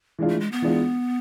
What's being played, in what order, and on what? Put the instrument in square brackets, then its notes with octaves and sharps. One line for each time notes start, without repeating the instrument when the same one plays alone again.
[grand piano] E3 G#3 D4 F4
[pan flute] A3
G#3
B3
[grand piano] E3 G#3 D4 F4